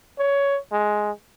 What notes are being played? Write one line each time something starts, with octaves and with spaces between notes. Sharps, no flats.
C#5
G#3